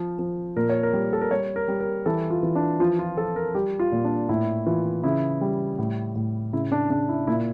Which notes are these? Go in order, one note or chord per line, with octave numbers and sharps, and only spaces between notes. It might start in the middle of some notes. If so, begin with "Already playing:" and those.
Already playing: F3
F3
A#2 A#4
C#5
A#4
G3
A4
A#4
G3 C#5
A#4
G3
A#4
E3 A4
F4
E3
D4
F3 F4
F4
F3 A4
A#4
G3 G4
F4
A#2
D4
A2 E4
E3 F4
C#3 E4
G3
A2
A2
C#3 E4
D4
C#3 D4
E4
A#2 E4